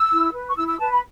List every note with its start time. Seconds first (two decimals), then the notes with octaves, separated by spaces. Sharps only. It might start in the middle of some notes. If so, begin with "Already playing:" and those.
Already playing: E6
0.10 E4
0.33 B4
0.49 C#6
0.56 E4 E6
0.68 E6
0.79 B4 A5
0.91 B5